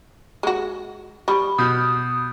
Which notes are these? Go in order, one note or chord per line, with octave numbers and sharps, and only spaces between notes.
G#3 F#4
G3 B5 C#6
B2 D#6 F6 G6